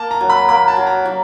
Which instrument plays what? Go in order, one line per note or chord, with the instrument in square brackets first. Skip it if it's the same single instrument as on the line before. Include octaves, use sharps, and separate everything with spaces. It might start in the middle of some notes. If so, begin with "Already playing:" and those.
Already playing: [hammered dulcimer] A#3 [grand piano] A5
[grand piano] A#5
[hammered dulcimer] F#3
[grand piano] B5
[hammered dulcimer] A#3 [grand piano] B5
[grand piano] A5
[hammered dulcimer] F#3
[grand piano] A#5
[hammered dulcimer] F#3